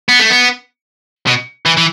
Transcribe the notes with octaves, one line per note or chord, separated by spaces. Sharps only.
B3
A3
B3
B2
E3
E3